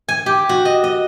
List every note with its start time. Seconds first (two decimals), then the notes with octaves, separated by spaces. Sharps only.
0.09 G#5
0.26 G4
0.49 F#4
0.65 D#5
0.84 D#5